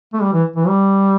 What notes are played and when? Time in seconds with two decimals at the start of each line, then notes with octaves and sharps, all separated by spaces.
0.13 A3
0.22 G3
0.33 E3
0.56 E3
0.67 G3